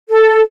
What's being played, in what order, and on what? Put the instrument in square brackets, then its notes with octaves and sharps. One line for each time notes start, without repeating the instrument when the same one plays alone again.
[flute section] A4